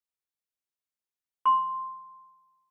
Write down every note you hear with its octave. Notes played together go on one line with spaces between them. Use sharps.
C6